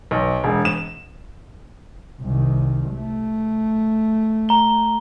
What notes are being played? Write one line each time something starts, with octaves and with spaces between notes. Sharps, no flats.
B1
E1
E7
C2 D#3
A3
A#5 G7